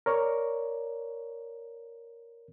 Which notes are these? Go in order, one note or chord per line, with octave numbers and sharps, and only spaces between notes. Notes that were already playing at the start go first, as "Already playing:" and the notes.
A#4 C#5 D5 C#6